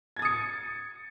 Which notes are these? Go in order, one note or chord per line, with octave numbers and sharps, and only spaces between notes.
D#6 G#6 A6 C#7